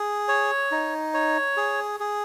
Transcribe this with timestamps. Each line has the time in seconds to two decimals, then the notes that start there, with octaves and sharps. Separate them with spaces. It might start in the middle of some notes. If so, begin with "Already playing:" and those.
Already playing: G#4
0.28 C#5
0.71 D#4
1.14 C#5
1.57 G#4
2.00 G#4